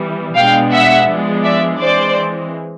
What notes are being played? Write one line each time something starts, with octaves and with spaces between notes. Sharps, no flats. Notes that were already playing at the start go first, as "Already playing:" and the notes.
Already playing: E3 G3 B3
B2 G#3 B3 D4 F5 G5
E5 F#5
F3 G#3 B3 D4
D5 E5
E3 G#3 C4 C5 D5